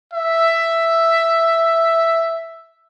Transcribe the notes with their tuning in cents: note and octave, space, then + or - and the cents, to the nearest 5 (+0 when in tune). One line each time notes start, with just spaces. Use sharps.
E5 +5